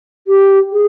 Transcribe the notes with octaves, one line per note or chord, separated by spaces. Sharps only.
G4
G#4